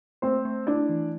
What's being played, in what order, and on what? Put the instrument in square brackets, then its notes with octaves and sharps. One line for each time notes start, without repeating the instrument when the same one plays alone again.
[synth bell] A3 [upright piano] C4 C5
[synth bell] A3
[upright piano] D4 D5 [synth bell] E4
[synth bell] E3